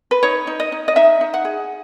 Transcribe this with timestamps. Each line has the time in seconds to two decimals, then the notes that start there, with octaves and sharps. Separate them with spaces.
0.11 B4
0.23 D#4 C#5
0.47 D#4
0.60 D#5
0.72 D#4
0.88 D#5
0.96 D#4 E5
1.21 D#4
1.34 F#5
1.45 G#4